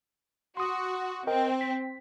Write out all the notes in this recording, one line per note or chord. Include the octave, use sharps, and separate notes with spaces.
F#4 C6 D#6
C4 A#4 D#5 G5
B6